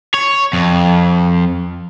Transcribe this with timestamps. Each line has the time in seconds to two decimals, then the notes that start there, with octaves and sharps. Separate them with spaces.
0.14 C#5
0.53 F2